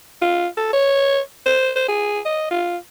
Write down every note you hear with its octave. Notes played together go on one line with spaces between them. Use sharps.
F4
A4
C#5
C5
C5
G#4
D#5
F4